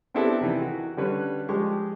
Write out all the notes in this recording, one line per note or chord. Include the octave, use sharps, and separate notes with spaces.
B3 C4 D4 E4 G4 A4
C3 D#3 E3
F#4
D3 G3 C#4 B4 C#5
F3 G#3 G4 C#6